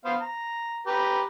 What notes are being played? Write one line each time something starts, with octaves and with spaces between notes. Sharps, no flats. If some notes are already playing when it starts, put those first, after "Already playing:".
B3 C5 F5
A#5
G4 B4 A#5